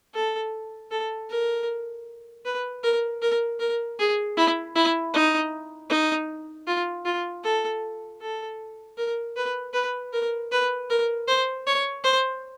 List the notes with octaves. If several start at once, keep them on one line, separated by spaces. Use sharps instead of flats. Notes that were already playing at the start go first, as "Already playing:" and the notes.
A4
A4
A#4
B4
A#4
A#4
A#4
G#4
E4
E4
D#4
D#4
F4
F4
A4
A4
A#4
B4
B4
A#4
B4
A#4
C5
C#5
C5